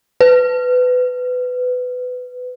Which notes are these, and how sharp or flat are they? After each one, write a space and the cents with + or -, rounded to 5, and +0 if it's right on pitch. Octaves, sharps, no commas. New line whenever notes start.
B4 +20